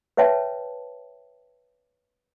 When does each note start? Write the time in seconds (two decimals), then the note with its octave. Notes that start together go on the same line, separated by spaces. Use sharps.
0.17 B4 C#5 E5 G5 A5